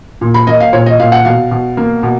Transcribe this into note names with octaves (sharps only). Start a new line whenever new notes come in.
A#2
B5
A#3 D#5
F5
A#2 C#5
D#5
A#2 F5
F#5
B2 F5
B2
A#3
B2